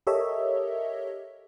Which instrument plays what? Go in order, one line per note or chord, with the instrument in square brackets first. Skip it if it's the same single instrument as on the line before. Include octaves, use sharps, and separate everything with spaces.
[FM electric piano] G4 A4 A#4 C#5 D#5 E5